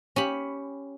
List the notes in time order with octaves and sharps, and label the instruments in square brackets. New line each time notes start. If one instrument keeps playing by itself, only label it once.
[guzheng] C#4 G4 B5